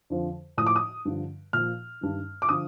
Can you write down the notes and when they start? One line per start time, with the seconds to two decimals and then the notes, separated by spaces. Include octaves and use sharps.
0.10 F2 D3 F3
0.57 A2 F3 D#6
0.66 D6
0.76 D#6
1.05 G2 D3 F3
1.53 A#2 F3 F6
2.01 G2 D#3
2.42 D6
2.49 D3 F3 D#6